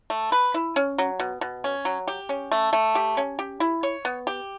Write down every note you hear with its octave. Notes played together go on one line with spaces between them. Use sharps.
A3
B4
E4
C#4
F#3
B2
B2
C#4
F#3
G4
C#4
A3
A3
G4
C#4
G4
E4
C#5
B3
G4